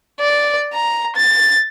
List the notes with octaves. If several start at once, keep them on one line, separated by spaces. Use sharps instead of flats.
D5
A#5
A6